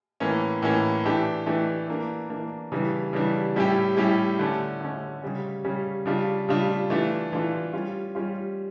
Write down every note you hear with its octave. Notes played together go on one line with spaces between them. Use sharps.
A2 E3 A#3 C#4
A2 E3 A#3 C#4
E3 A3 D4 G4
E3 A3 D4 G4
E3 A#3 D4
E3 A#3 D4
C#3 E3 G3 D4
C#3 E3 G3 D4
A2 G3 C#4 E4 G4
A2 G3 C#4 E4 G4
D3 A3 C#4
D3 A3 C#4
C#3 G3 C#4
C#3 G3 C#4
C#3 G3 D4 F4
C#3 G3 D4 F4
E3 A3 D4 F4
E3 A3 D4 F4
G3 C#4 F4
G3 C#4 F4